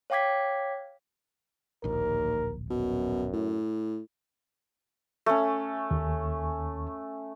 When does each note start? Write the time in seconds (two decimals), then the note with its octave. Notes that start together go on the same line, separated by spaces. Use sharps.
0.10 C#5 F5 G5 D6 G#6 B6
1.84 D1 A#1 D#2 A#4
2.70 F#2 B2
3.33 A2
5.26 A3 C#4
5.91 D#2